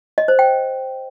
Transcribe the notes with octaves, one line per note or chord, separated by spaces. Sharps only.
D#5
C5
G5